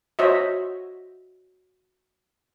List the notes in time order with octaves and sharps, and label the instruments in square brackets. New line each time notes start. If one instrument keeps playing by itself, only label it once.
[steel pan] F#4 C5 C#5 D#5 E5